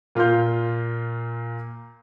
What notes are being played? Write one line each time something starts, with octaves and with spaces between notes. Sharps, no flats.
A#2 F4 F5 C6 G6